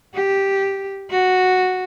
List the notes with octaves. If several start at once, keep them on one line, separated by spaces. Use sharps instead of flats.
G4
F#4